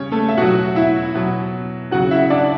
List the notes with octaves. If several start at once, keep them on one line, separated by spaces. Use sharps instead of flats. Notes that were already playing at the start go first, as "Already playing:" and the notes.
Already playing: C#3 G3 C#4 C#5
A3 A4
E5
B2 F#3 F#4 F#5
E4 E5
B2 F#3
C#3 F#3 F#4 F#5
E4 E5
D4 D5